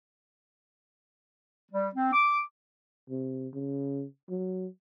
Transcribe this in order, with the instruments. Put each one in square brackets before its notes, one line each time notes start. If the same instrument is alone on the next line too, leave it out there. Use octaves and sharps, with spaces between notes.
[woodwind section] G3
C4
D6
[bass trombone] C3
C#3
F#3